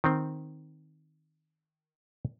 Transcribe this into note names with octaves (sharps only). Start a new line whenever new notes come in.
D#3 C4